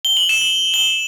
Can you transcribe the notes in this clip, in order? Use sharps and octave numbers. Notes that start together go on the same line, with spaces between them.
G7
F#7
E7
F#7
G7